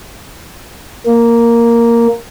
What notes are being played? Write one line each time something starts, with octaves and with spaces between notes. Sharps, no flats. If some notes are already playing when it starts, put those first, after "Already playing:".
A#3